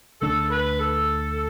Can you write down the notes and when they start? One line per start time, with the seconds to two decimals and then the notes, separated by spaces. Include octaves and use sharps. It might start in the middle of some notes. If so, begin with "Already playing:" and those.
0.21 D2 D3 A3 D4 A4
0.50 B4
0.78 A4